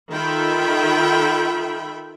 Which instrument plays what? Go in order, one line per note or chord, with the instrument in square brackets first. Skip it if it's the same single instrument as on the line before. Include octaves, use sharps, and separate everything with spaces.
[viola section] D#3 F4 A4 E5 G5 B5